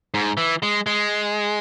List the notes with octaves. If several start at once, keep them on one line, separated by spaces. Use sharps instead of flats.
G#2
E3
G#3
G#3